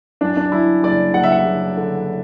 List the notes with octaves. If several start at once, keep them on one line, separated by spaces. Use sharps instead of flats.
F#2 D4
D4
F#2 E4
F#1 D5
F#1 F#5
E5
F#5
F#1
D3